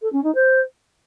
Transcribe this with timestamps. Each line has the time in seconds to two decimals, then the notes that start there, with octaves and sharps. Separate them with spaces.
0.01 A4
0.12 C#4
0.23 D#4
0.34 C5